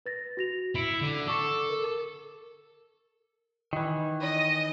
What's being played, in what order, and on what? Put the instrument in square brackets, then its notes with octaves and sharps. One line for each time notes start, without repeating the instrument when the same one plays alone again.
[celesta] B4 A6 A#6
F#4 A#6 F7
[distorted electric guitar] E4 [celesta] C#7 D7 F7
[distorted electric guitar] D3
[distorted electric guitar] A4 [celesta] C#6 D6
[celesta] A#4
[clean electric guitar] D#3 E3
[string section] D#5